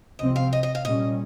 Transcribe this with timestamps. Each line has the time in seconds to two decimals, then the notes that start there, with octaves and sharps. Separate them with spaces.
0.19 C2 C3 F3 C4 D#5
0.36 F5
0.53 D#5
0.63 D#5
0.75 F5
0.85 A#2 G3 C#4 D#5